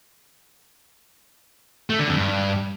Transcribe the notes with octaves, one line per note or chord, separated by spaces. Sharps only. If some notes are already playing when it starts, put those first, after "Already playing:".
A3
D3
F2
G2